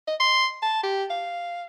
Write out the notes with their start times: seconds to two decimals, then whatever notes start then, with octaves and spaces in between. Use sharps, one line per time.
0.08 D#5
0.20 C6
0.63 A5
0.83 G4
1.10 F5